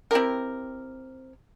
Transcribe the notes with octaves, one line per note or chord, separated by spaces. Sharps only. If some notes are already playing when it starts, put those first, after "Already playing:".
C4 E4 G4 A#4